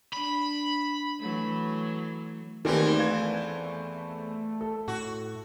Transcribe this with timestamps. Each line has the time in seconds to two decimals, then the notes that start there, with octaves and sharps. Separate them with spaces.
0.13 D4 B5
1.19 E3 F#3 A3
2.65 E2 D#3 E3 A3 A#3 C4 G4
2.99 F5 G#6
4.61 A4
4.88 A2 F#4